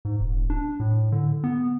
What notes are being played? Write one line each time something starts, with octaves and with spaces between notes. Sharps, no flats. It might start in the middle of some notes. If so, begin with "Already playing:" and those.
G#2
D#1
D4
A2
D3
B3